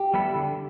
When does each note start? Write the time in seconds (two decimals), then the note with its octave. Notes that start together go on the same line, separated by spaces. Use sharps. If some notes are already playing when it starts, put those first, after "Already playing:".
Already playing: G4
0.14 G3 B3 E4 A4
0.35 D3